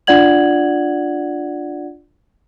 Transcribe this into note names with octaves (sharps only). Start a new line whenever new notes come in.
D4 F4 D5 F#5 G#6 F#7